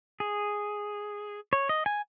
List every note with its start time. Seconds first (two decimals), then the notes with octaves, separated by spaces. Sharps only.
0.20 G#4
1.53 C#5
1.69 D#5
1.86 G#5